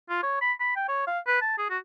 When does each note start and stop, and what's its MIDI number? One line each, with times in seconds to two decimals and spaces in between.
0.10 0.19 65
0.23 0.40 73
0.41 0.52 83
0.60 0.71 83
0.76 0.84 79
0.88 1.05 73
1.07 1.19 77
1.27 1.41 71
1.41 1.58 81
1.58 1.67 68
1.70 1.78 66